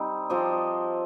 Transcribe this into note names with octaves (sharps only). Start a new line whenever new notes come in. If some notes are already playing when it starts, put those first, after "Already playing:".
Already playing: G3 C4 D#4
F3 C4 G4 D#5